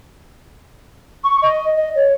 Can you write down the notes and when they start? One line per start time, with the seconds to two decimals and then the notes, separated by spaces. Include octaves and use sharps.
1.24 C#6
1.42 D#5
1.77 D#5
1.95 C#5